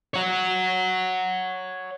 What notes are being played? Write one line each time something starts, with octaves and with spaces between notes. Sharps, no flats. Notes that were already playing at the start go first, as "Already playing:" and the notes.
C#5 F#5